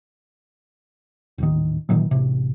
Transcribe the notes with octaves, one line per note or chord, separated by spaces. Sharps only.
D#1 A1 D#3
A#2 D#3 E3 F#3
A1 C3